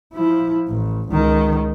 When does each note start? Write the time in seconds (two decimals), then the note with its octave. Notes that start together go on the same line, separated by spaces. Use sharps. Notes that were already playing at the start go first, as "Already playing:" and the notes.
0.14 F3 E4
0.69 A1
1.09 C#2 D#3